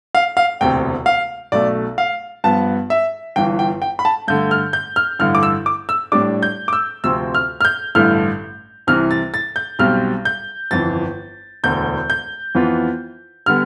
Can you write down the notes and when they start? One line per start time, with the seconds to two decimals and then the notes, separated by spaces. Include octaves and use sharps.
0.15 F5
0.37 F5
0.61 E1 D2 C3 G5
1.06 F5
1.52 B1 B2 A3 D5
1.98 F5
2.44 G2 F3 B3 A5
2.90 E5
3.36 G1 G2 E3 G5
3.59 G5
3.82 G5
3.99 B5
4.05 A5
4.28 G2 D3 A3 G6
4.51 F6
4.73 G6
4.96 F6
5.19 A1 G2 D3 F6
5.35 D6
5.43 E6
5.66 D6
5.89 E6
6.12 A2 G3 D4 D6
6.43 G6
6.68 D6
6.73 E6
7.04 D2 C3 F3 C4 E6
7.34 F6
7.61 F6
7.65 G6
7.95 A1 G2 D3 A3 E4 F6
8.87 C2 C3 E3 F6
9.11 A6
9.34 A6
9.56 G6
9.79 B1 B2 G3 C4 F6
10.25 G6
10.71 G1 F2 E3 A6
11.64 E1 D2 D3 G6
12.10 G6
12.55 F2 E3 B3 F4
13.46 D3 G3 B3 F6